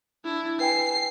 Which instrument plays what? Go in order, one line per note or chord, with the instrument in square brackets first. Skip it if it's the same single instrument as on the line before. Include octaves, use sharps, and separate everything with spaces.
[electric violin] D4 E4
[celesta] B4 G5 G#5 [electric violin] C7